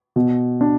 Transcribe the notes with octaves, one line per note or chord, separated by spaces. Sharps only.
B2
D4